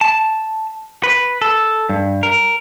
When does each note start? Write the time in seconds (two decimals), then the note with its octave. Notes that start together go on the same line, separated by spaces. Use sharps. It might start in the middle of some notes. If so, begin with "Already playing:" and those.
0.01 A5
1.03 B4
1.42 A4
1.89 G2
2.23 A#4